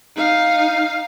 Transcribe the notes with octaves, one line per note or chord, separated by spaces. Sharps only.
D#4 F5